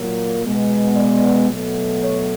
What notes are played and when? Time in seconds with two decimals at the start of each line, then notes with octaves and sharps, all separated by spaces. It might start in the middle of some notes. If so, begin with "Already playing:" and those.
Already playing: A#2 F#3 A#3
0.42 B2 G#3 B3
0.95 D5
1.49 B2 F#3 A3
2.03 C#5